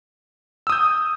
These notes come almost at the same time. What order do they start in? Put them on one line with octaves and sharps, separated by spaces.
E6 D#6 G6